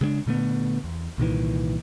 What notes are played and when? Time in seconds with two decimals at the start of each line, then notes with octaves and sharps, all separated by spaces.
0.01 C#3 G#3 B3 D4
0.26 A#2 D3 A3 B3
0.84 E2
1.18 C2 A#2 D#3 E3